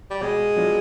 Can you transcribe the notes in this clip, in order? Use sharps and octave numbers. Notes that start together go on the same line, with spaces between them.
G3
B2 G#3
F#3 B3 D4 F4